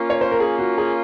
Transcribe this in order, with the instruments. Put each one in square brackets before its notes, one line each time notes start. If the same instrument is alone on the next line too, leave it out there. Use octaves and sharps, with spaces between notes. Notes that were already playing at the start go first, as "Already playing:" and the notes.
Already playing: [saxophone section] A#3 C#4 F4
[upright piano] C#5
C5
A#4
G#4
F#4
G#4